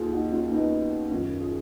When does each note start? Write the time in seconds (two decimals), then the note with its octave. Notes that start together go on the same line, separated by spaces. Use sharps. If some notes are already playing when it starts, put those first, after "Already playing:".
Already playing: D#2 F4 G#4
0.12 D#4 F#4
0.32 C#4 F4
0.52 B3 D#4
1.10 F#2 D#3 C#4 F4
1.40 F4 G#4